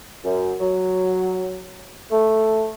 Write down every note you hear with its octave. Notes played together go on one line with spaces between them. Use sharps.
F#2
F#3
A3